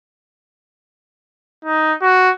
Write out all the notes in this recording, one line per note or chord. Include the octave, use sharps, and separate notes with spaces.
D#4
F#4